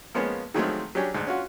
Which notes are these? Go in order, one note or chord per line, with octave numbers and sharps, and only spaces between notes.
F3 G#3 A#3 B3 C#4
D#3 F3 F#3 G#3 A3 C4
F#3 C#4 D4 G4 G#4 C#5
D2 G#2
C#4 F4 F#4